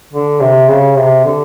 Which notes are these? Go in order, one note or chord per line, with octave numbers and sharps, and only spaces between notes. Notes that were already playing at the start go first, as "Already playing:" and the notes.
D3
C3
C#3
C3
D3